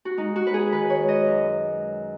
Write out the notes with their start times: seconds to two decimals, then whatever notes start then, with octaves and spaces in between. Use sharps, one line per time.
0.05 F#4
0.17 G#3 D#4
0.36 F#4
0.45 G#3 B4
0.54 G#4
0.72 D#3 B4
0.90 C#5
0.99 G#3
1.09 D#5
1.27 F#2